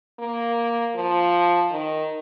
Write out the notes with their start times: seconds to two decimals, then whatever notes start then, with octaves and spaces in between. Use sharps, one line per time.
0.19 A#3
0.96 F3
1.71 D#3